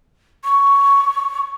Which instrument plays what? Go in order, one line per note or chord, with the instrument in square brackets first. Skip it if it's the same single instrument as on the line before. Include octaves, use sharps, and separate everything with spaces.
[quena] C#6